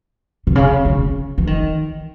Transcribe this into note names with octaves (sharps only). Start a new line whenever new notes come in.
C3
C#3
C#3
E3
D#3